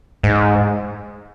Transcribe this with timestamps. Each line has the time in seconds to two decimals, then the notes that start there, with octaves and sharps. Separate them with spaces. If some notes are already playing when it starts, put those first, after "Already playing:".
0.23 G#2